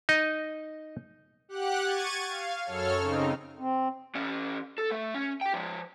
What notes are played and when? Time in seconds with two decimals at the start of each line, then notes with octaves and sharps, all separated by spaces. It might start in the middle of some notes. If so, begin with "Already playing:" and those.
0.09 D#4 D#5
1.49 G4 F#5 F#6
1.83 C#6 G#6 A6 D#7
2.27 F5
2.65 F#2 A4 C#5 F6
2.98 C#3 C4 D#4
3.59 C4
4.15 E3 C#4
4.78 A4
4.91 A3
5.14 C#4
5.41 G4 G5
5.54 F3 G#3